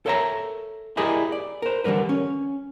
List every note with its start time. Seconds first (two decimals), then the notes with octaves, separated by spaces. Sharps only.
0.06 A4 A#4 C#5 E5 F5 A#5
0.97 E4 G4 G#4 A#4 D5 D#5
1.32 D5
1.62 A#4 C5
1.84 D3 E3 G3 A#4 B4
2.09 C#4